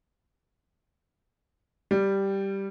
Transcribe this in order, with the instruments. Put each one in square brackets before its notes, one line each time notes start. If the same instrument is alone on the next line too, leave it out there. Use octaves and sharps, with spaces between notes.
[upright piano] G3